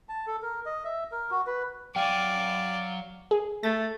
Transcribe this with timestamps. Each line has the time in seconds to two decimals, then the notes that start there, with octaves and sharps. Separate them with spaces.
0.09 A5
0.27 A4
0.42 A#4
0.66 D#5
0.85 E5
1.12 A#4
1.31 F#4
1.47 B4
1.96 F#3 D5 F5 G5 G#5
3.31 G#4
3.63 A3 A6